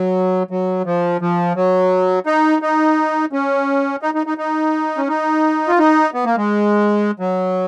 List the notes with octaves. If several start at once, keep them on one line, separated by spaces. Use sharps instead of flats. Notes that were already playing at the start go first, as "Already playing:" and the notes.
Already playing: F#3
F#3
F3
F3
F#3
D#4
D#4
C#4
D#4
D#4
D#4
D#4
C#4
D#4
F4
D#4
B3
A#3
G#3
F#3